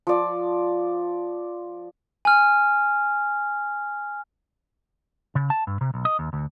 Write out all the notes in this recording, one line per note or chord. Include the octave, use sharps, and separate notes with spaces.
F3 D5
G#5 F6
C#3
A5
G2
C3
B1
D#5
D#2
D2